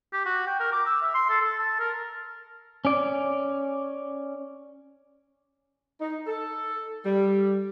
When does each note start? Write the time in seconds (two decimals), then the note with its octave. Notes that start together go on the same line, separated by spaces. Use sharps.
0.13 G4
0.25 F#4
0.47 G5
0.60 A#4
0.72 D6
0.86 E6
1.02 E5
1.14 C6
1.29 A4
1.42 A4
1.59 A5
1.79 A#4
2.85 C#4 D5
6.00 D#4
6.26 A4
7.05 G3